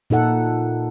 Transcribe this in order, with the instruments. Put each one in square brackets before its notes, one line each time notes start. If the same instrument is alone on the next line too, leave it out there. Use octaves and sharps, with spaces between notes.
[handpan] A#2 D#4 A4 F#5